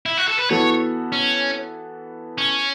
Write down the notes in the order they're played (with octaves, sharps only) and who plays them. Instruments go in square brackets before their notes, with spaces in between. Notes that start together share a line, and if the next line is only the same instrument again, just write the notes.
[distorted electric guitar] E4
F#4
A4
B4
[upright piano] E3 B3 F#4 A4 [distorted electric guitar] C#5
[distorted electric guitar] C#4
C#4